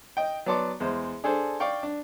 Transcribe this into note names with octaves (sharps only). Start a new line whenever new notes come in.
D#5 G5
F#3 B3 D5 A5 C6 D6
E2 G#3 C5
D4 G#4 A4 C5
D5 F5 G5 C#6
D4